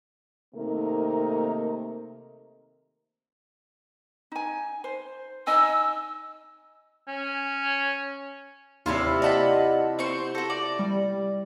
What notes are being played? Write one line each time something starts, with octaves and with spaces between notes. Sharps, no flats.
C3 D#3 A3 A#3 D#4 A#4
D#4 G#5
C5
D#4 D#5 G#5 E6
C#4
D#2 C3 E4 F4
D5 D#5 F#5 A5 B5
C4 C5 C#6
F#4 A4 A#6
D5
G3